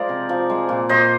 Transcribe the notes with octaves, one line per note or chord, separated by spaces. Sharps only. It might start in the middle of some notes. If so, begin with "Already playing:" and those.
Already playing: F3 G#3 G#4 A#4 C5 D5
C3
F3
G#3
A#2
A#2 C5 D#5